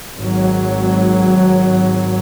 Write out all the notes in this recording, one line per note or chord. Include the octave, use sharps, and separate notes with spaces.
G#1 F#3